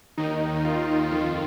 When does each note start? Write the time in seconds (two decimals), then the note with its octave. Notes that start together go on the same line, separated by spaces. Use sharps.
0.18 D#2 D#3 D#4
0.65 F4
1.11 F2 D#3 F4